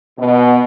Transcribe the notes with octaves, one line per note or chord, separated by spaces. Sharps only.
B2